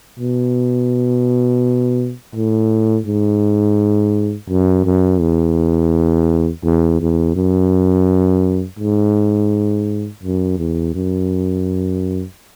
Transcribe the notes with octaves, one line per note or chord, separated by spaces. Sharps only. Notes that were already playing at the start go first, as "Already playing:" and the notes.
B2
A2
G#2
F#2
F#2
E2
E2
E2
F#2
G#2
F#2
E2
F#2